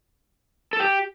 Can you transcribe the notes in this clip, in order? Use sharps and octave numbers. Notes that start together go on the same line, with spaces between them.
A4
G4